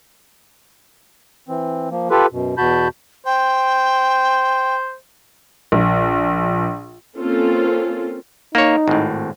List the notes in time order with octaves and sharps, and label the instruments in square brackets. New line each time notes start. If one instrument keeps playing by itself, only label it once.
[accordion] E3 C4
F3 A#3
F4 G4 A4 B4
F#2 B2
E2 B2 F#4 A5 B5 G6
[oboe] C5 [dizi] G5
[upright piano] A#1
[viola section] A#3 C4 C#4 F4 A4
[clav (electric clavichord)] A#3 C#5 [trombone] D#4
[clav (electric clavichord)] G#1 A2